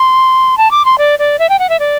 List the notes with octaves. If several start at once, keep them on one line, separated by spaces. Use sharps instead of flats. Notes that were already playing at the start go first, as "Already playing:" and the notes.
Already playing: C6
A5
D6
C6
D5
D5
E5
G5
F#5
E5
D5